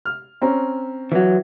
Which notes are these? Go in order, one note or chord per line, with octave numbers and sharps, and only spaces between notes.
F6
C4 C#4 A#5
E3 F#3